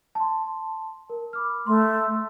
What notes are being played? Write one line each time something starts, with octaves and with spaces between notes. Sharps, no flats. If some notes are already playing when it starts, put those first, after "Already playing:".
A5 C6
A#4
B5 D6 F6
A3 C6